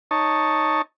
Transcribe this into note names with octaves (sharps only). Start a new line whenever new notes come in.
D#4 C#5 A5